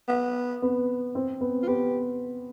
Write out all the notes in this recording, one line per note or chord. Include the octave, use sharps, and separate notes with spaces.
B3
B3
C4
B3
F4
B3 G4